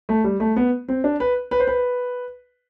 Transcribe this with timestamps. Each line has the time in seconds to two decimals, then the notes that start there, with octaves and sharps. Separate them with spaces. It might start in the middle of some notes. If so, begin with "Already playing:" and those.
0.09 A3
0.24 G3
0.40 A3
0.56 B3
0.88 C4
1.04 D4
1.20 B4
1.51 B4
1.60 C5
1.67 B4